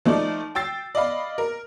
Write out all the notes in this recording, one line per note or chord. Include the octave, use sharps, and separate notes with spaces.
F3 A3 D#4 D5
G5 E6 A6 C7
D5 D#5 F5 B5
A#4